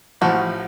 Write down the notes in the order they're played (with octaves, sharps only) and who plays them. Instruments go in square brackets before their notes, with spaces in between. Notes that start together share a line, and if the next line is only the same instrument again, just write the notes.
[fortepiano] A1 A2 F3 [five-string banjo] F#4